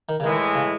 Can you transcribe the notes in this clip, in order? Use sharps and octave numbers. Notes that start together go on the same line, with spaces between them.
D#3
C#3
A2 D#3 E3 G#3
C#3